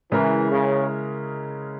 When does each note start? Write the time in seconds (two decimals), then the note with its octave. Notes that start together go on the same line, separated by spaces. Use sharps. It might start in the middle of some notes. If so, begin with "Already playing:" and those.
0.11 C#3 E3 G#3 C#4 E4 A#4
0.49 C#3